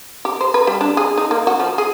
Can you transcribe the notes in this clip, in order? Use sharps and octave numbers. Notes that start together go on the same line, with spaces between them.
G4
C5
B4
G3
D4
G#4
D#4
A#3
F#4
F3
G#4